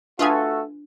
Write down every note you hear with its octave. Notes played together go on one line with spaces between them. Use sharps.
A3 D4 F4 F#4 A4 B4 G#5 D#6